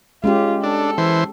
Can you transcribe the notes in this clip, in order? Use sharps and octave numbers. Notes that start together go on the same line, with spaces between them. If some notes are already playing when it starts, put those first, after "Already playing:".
G#3 C#4 F4 G4
D4 A4
E3 C5